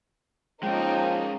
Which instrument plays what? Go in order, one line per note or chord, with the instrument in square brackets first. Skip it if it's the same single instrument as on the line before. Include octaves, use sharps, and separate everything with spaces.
[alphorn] F3 [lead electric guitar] G#3 C#4 [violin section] A#3 D#4 [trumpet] G5